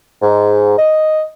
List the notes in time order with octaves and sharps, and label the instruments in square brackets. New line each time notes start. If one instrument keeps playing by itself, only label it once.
[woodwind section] G#2
D#5